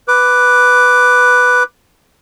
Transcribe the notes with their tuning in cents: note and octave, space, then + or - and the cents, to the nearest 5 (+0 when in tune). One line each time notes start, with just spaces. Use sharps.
B4 +0 D6 +0